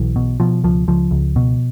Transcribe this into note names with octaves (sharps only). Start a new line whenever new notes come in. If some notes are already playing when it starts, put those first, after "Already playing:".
Already playing: B1 E3
B2
B2 F3
C#2 F3
C#2 F3
C#2
B2